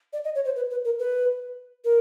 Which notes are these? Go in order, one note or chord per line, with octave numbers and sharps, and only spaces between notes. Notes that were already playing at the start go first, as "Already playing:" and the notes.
D5
D#5
C#5
C5
B4
B4
A#4
B4
A#4